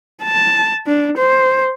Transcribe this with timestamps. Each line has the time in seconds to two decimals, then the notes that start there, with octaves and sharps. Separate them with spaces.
0.23 A5
0.87 D4
1.18 C5